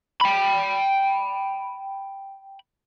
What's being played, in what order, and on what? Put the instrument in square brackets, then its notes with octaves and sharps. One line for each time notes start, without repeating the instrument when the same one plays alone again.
[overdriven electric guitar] G5 B5